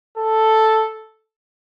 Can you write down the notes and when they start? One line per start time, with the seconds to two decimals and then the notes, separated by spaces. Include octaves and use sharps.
0.18 A4